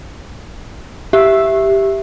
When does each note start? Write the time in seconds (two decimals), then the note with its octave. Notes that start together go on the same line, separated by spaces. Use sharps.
1.13 G4 E5